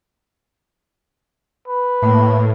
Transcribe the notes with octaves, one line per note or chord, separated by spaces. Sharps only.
B4
A2 A#3